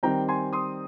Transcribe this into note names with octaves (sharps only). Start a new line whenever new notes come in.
D#3 G3 C4 G5 A#5
G#5 C6
C6 D#6